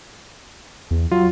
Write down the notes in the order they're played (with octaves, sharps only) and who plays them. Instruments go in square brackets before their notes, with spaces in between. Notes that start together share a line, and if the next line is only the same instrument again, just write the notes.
[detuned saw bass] E2
[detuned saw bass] F#3 [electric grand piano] F4